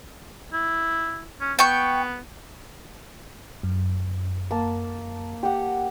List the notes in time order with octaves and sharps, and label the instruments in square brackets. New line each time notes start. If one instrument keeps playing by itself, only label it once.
[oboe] E4
C#4
[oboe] B3 [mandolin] G5 C#6
[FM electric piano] F#2
[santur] A#3 A5
G4 F#5